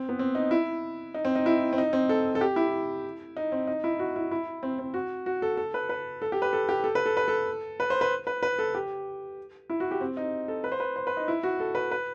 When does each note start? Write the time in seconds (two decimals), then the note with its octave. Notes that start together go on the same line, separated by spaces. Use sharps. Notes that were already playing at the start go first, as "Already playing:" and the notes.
Already playing: C4
0.09 B3
0.19 C4
0.35 D#4
0.51 E4
1.14 D#4
1.25 C4
1.35 D#4
1.46 E4
1.73 C4
1.78 D#4
1.93 C4
2.09 A4
2.35 A4
2.41 G4
2.56 E4
3.37 D#4
3.52 C4
3.67 D#4
3.84 E4
3.99 F#4
4.16 E4
4.31 E4
4.63 C4
4.79 C4
4.94 F#4
5.26 F#4
5.42 A4
5.57 A4
5.74 B4
5.89 B4
6.22 A4
6.32 G4
6.42 B4
6.53 A4
6.69 G4
6.84 A4
6.95 B4
7.06 A4
7.17 B4
7.28 A4
7.80 B4
7.90 C5
8.01 B4
8.27 B4
8.43 B4
8.59 A4
8.75 G4
9.70 E4
9.80 F#4
9.91 G4
10.01 C4
10.17 D#4
10.48 A4
10.64 B4
10.72 C5
10.80 B4
10.96 C5
11.07 B4
11.17 D#4
11.28 E4
11.43 F#4
11.60 A4
11.75 B4
11.91 B4